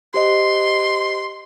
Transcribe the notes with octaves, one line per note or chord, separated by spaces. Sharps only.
G4 C5 D#5 C6